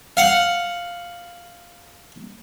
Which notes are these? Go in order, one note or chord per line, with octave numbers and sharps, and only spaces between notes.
F5 F#5